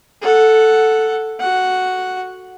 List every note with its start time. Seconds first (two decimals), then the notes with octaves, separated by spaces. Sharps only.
0.21 A4 F#5
1.39 F#4 F#5